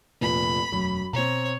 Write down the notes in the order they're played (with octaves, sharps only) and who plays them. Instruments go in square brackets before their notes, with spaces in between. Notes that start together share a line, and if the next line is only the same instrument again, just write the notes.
[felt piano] F1 A#2 [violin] B5
[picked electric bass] E1 F#3 A3 [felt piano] F#2
[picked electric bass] B2 [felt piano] C4 A#5 [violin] C#5